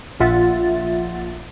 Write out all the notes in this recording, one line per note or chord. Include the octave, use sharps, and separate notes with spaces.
A#1 A#2 F4 E5 F#5 A6